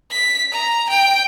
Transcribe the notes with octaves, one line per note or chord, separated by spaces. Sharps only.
B6
A#5
G5